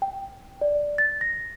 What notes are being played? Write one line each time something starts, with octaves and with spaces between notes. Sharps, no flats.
G5
D5
A6
A#6